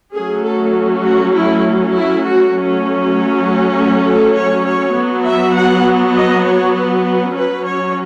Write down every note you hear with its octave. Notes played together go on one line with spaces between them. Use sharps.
F#3 A3 C#4 G#4
A4
F#4
E4
E4
F#4
F#3 A3 C#4
F#4
A4
C#5
C#5
F#3 B3
E5
F#5
D#5
C#5
B4
F#3 C#4 B4
C#5